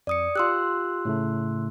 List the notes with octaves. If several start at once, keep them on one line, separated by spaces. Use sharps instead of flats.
F2 D5 D#6 C#7
F4 G4 C6 E6 F#6
A2 C#3 A3